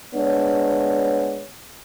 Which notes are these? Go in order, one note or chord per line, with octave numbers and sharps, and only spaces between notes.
G#3 B3 D4 C#5